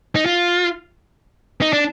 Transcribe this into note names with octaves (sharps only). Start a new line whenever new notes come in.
D#4
F4
D#4
D4